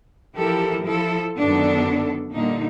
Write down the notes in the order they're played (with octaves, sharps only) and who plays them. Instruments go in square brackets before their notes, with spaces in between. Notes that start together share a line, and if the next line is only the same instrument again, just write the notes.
[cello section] E3 F3 E4 G4 A4 A#4
F3 E4 A4
F#2 D3 D#3 B3 D4 A4
A#2 D3 G3 A#3 D#4